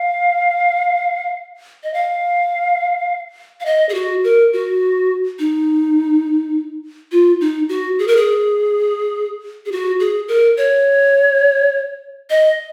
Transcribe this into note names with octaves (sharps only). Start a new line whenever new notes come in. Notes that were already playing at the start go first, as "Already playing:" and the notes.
Already playing: F5
D#5
F5
F5
D#5
G#4
F#4
A#4
F#4
D#4
F4
D#4
F#4
G#4
A#4
G#4
G#4
F#4
G#4
A#4
C#5
D#5